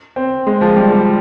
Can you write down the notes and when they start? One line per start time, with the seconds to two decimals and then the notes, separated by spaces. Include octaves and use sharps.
0.16 C4
0.47 G#3
0.61 F3
0.76 G3
0.92 G3